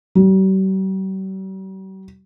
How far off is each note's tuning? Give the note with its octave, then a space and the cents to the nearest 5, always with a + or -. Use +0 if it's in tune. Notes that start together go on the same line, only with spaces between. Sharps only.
G3 -45